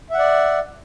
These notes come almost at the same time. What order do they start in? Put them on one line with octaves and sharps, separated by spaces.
E5 F#5 D5